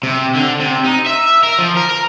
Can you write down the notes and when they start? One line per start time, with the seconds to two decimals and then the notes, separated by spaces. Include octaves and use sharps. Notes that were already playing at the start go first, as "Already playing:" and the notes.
0.03 C3
0.35 D3
0.60 C3
0.85 D#4
1.07 E5
1.43 A#4
1.58 F3
1.77 A#4
1.91 A#4